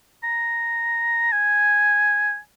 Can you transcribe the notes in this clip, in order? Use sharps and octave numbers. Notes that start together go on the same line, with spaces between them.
A#5
G#5